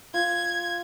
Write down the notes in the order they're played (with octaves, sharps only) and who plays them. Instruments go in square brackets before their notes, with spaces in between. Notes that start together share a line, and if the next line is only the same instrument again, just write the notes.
[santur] F4 [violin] G#6